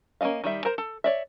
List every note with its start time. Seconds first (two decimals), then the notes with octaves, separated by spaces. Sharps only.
0.21 A#3 C#4 A#4 D#5 F5
0.44 D#3 G3 E5
0.65 A#4 C5 A#5
0.78 A4
1.04 C#5 D5 E5